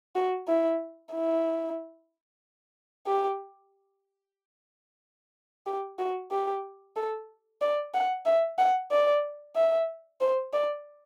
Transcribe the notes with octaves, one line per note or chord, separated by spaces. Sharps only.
F#4
E4
E4
G4
G4
F#4
G4
A4
D5
F#5
E5
F#5
D5
E5
C5
D5